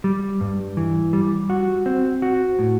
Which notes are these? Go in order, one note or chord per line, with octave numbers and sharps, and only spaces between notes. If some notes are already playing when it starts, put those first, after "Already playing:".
G3
G2
E3
G3
F#4
C4
F#4
A2